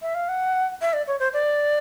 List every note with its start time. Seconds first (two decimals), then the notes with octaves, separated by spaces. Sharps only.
0.02 E5
0.15 F5
0.29 F#5
0.81 E5
0.93 D5
1.07 C#5
1.19 C5
1.33 D5